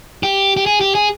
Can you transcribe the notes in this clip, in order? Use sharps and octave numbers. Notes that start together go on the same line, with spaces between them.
G4
G4
G#4
G4
G#4